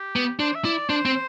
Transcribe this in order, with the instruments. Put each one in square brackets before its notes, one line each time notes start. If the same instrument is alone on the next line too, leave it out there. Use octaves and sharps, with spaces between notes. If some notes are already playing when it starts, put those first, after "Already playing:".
Already playing: [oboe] G4
[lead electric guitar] B3
[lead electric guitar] D4 [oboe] C5
[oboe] E5
[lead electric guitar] E4 [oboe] D5
[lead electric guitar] D4 [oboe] C5
[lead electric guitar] C4